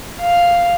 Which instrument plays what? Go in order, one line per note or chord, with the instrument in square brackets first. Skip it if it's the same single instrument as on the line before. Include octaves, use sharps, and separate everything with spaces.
[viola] F5